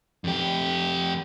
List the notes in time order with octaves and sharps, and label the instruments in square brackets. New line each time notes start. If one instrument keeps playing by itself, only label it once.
[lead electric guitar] F2 G4